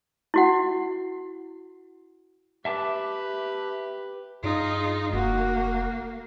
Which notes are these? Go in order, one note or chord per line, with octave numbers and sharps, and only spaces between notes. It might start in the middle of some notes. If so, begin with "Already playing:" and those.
E4 F#4 F#5
G4 B4 E5 A5 D6
G2 D#4 F4 G#4
F1 A#3 F#4